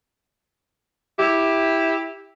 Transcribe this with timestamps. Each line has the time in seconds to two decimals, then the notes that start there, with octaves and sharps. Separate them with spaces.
1.20 E4 G4